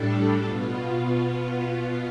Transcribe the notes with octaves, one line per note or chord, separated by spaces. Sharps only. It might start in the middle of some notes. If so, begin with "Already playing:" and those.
Already playing: A2 G3 D4 A4
B2 B3 F4